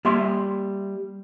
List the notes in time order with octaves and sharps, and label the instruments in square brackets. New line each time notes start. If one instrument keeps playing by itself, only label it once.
[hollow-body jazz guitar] G3 A#3 E5 C6